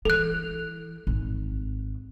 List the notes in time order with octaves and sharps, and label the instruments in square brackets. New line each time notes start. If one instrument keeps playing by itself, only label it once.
[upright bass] E3 [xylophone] A4 F#6
[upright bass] G#1